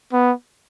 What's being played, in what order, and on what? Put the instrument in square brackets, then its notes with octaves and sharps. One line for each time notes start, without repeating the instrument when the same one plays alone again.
[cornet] B3